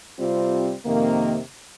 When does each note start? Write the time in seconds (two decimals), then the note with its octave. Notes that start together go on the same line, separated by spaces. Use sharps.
0.18 C3 G3 C4 F4
0.85 F2 C3 D#3 A#3